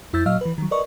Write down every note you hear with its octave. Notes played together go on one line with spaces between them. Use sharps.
F2 E4 E6 G6 A6
A#2 F#3 D#5 F5 E6 F6
E3 B4
D#3 F#3
A#4 B4 D5 D#5 C#6